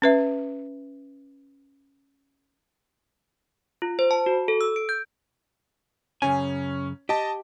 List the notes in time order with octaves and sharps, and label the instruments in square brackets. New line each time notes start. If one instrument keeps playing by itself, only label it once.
[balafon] C#4 B4 E5
[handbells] F4
C5
A5
F#4
A4
E6
D7
G6
[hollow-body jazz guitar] F#2 C#3 G#5 [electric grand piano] C#4
[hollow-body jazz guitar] G4 [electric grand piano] D#5 A5